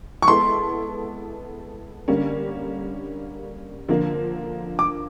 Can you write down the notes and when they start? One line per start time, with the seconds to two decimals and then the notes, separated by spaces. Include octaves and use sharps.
0.22 C#6
0.27 G#3 B3 E4 A4 C6
2.08 D3 G3 A#3 C#4
3.88 D3 F3 A#3
4.79 D6